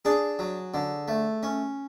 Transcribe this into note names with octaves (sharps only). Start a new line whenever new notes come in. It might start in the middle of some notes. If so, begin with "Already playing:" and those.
D4 G#4
F#3
D3
A3
C#4